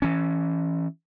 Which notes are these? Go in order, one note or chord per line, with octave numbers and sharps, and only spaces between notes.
E3 C#4